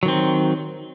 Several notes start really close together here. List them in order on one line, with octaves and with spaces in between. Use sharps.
F#3 D#3 C4